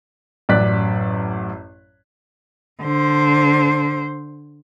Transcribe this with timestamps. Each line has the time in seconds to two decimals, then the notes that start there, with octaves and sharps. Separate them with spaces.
0.49 A1 F#2 D5 F#6 B6
2.82 D3 C5